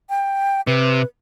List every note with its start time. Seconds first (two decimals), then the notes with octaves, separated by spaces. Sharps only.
0.10 G5
0.67 C3 B4